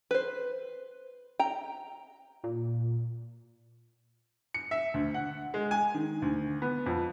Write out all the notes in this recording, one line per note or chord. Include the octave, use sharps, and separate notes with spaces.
B4 C5
G5 A#5
A#2
C#7
E5
D2
F#5
G#3
G#5
D#3
D2
B3
F2